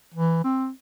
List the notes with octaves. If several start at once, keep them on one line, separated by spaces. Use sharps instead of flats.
E3
C4